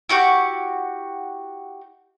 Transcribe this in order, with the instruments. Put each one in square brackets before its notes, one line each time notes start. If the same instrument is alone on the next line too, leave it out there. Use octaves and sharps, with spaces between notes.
[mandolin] E4 F#4 G4 C#6